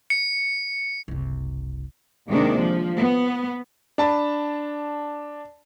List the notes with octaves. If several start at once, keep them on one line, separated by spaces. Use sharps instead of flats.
C#7
F#1 C2
D#2 C3 D#3 G#3 D4
F3
B3
D4 A5 B5